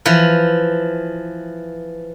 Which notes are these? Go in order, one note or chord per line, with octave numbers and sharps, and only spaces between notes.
E3 F3